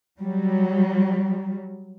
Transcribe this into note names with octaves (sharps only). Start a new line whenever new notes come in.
F#3 G3